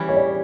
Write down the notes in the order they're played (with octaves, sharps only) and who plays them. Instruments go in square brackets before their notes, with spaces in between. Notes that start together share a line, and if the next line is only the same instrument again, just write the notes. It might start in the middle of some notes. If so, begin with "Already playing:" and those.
Already playing: [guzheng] E3 G3 C#4
[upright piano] C#5
D5